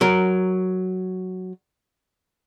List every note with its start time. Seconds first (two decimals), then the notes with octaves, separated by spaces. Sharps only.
0.01 F#3 A#4